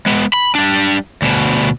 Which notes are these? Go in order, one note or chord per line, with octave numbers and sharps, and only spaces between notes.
G#3 B3
B5
G3 D4
D2 B2